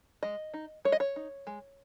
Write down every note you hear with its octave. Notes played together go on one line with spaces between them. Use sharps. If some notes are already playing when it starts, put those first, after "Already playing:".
G#3 D#5
D#4
G#3 C#5
D#5
C#5
D#4
G#3